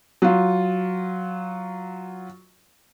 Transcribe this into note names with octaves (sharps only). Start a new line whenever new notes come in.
F#3 F4